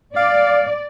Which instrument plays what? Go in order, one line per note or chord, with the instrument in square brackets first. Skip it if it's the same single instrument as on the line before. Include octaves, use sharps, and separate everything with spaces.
[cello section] D5 [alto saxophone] F5